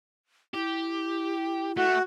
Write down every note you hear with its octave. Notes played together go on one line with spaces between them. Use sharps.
E4 G4
A3 F#4